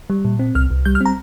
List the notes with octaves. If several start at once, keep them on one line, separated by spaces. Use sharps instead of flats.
G3
A#2
C4
C2 F6
C2
G3 G6
F6
C4 A#5